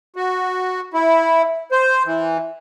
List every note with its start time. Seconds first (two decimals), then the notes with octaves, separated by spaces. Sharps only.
0.16 F#4
0.94 E4
1.72 C5
2.06 E3